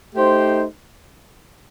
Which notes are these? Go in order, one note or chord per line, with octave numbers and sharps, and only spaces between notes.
A3 D#4 G4 C5